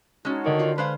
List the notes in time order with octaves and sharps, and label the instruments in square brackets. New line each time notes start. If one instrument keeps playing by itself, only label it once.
[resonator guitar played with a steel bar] G#3 C#4 [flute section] D#4 F#4 C#5 [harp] A5 F6
[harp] D3 D5 [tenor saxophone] D#3
[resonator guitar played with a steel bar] F4
[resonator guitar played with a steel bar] G#3 C5 F5 [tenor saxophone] B4